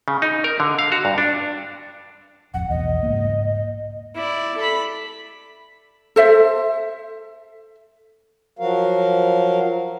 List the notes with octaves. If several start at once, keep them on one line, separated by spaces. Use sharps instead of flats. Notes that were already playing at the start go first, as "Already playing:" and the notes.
C#3
D#4
A#4
D3
F5
F#4
G2
D4
D1 F2 F#5
B1 E2 D#5
G#2 C#3 A#3
E4 D5
A4 B5
A4 C5 E5
F3 F#3 F#4 A#4 F5